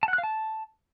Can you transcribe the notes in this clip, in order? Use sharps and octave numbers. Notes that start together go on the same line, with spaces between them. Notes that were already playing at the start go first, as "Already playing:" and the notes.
A5
F#5
F#6
F5
A5